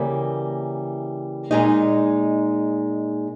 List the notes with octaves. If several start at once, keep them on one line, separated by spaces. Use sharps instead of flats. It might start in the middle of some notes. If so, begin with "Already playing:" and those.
Already playing: C#3 E3 G3 A#3
A#2 G#3 D#4